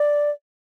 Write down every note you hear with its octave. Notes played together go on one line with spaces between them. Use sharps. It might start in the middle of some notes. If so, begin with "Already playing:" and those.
Already playing: D5